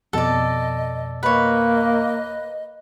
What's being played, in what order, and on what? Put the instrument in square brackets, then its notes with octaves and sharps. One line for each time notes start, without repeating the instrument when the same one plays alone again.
[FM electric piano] F2 B2 [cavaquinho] A4 D5 [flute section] D#5
[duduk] A#3 [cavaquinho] B4 C#5 [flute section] D#5